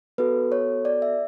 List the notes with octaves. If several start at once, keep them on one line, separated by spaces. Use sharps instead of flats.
B3 F#4 A4 B4
C#5
D5
E5